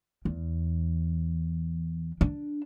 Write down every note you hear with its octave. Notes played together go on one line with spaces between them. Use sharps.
E2
D4